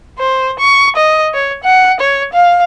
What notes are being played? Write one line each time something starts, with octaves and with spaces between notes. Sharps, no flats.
C5
C#6
D#5
C#5
F#5
C#5
F5